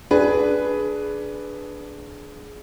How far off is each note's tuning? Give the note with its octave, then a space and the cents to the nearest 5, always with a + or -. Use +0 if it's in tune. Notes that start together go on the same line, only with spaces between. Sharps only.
D4 +0 G#4 +15 B4 +0